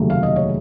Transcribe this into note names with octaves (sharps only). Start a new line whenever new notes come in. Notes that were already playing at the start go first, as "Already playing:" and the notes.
Already playing: F1 D#2 C#3 F#3 A3
F5
D#5
C#5